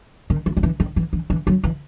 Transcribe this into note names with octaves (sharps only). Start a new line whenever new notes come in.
D#3
E3
F#3
E3
D#3
E3
E3
E3
F#3
E3